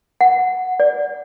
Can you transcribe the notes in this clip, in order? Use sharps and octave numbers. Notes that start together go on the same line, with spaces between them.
F#5
D5